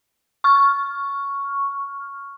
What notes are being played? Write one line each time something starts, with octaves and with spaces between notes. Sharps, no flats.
C#6 F6